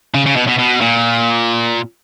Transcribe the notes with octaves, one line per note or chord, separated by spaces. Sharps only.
C#3
C#3
B2
B2
B2
A#2